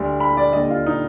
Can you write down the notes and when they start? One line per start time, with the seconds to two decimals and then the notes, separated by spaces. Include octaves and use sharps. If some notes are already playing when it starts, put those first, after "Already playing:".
Already playing: D2 D3 G3
0.20 B5
0.37 D5
0.53 D#2 D3 G3 D#5
0.70 F4
0.86 D#4